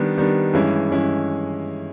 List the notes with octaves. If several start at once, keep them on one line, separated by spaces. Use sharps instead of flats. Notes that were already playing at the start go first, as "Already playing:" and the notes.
Already playing: D#3 G3 B3 D4
D#3 G3 B3 D4
G2 E3 G#3 C#4 E4
G2 E3 G#3 C#4 E4